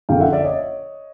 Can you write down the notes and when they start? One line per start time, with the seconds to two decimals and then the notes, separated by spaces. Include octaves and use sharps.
0.09 F#1 F2 D3 F5 G5
0.20 E5 F#5
0.33 D5 E5
0.44 C#5 D#5